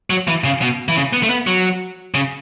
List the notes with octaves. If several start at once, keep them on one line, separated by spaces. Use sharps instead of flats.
F#3
E3
C#3
B2
E3
C#3
B3
A3
B3
F#3
C#3